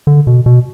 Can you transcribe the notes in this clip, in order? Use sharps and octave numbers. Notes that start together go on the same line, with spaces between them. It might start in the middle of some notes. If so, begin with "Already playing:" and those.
D3
B2
B2